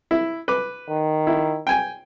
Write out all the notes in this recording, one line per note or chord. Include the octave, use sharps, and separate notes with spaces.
E4
B4 D6
D#3
E4
G5 G#5